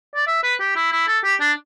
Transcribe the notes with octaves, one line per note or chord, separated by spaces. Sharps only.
D5
E5
B4
G4
E4
E4
A4
G4
D4